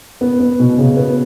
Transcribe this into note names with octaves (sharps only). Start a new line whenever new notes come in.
B3
B3
B2
C#3
B3